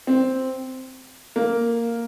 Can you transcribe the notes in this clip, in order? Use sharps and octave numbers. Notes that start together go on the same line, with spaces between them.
C4
A#3